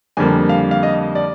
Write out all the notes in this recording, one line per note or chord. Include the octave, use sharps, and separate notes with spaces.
F2 D3 G3 A#3 G#5
F5
F5
D#5
D5